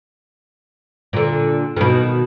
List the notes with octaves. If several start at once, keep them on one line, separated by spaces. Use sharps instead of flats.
A#2 D3
B2 D#3